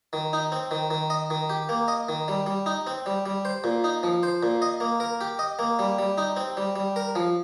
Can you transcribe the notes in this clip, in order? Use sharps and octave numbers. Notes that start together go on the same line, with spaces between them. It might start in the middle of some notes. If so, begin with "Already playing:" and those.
D#3
D#4
C4
D#3
D#3
D#5
D#3
G4
A#3
D#5
D#3
G3
G3
D#4
C4
G3
G3
C5
A#2
D#4
F3
C5
A#2
D#5
A#3
A#4
G4
D#5
A#3
G3
G3
D#4
C4
G3
G3
A#4
F3